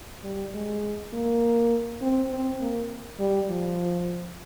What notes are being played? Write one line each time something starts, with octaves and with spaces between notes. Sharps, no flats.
G3
G#3
A#3
C4
C4
A#3
G3
F3